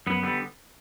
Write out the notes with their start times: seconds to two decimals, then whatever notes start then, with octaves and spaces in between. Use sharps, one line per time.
0.07 F#2 B3
0.23 D3 G3 B3